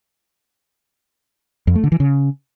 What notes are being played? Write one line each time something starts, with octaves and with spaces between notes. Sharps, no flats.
F2
A3
D3
E3
C#3